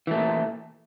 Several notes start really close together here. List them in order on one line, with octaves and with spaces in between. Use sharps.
E3 A3 A#2